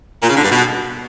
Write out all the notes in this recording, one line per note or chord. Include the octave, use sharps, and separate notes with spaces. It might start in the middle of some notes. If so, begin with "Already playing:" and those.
A#2
C#3
D3
G2
B2